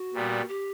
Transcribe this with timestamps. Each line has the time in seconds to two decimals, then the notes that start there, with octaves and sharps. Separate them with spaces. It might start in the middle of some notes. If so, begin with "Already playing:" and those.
Already playing: F#4
0.14 A#2 G3 B3
0.48 G4